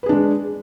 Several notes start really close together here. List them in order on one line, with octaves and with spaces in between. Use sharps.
B4 G#4 D4 G#3